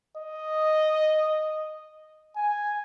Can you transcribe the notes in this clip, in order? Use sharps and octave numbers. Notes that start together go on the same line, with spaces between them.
D#5
G#5